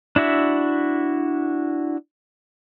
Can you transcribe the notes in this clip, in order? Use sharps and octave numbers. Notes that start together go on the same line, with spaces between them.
D4 E4 F#4 E5